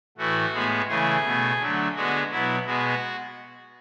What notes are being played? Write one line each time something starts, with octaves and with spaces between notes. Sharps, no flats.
A2 E3 A3 F#4
A2 G#3 B3
C#3 E3 A3 G#4
B2 A3
D3 F#3 A3
D3 G#3 B3 F#4
B2 F#3 B3 E4
B2 G#3 B3 F#4